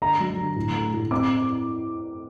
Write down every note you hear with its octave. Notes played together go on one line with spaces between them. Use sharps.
D3 A#5
F#3
D3
A2
A3
A2
C4 D6